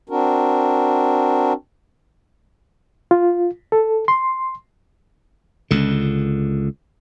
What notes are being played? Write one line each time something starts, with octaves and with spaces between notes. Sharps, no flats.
C4 D4 F#4 A#4
F4
A4
C6
C#2 D3